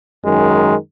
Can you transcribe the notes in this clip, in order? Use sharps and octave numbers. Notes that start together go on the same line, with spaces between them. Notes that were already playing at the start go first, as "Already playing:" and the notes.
F#2 D#3 G#3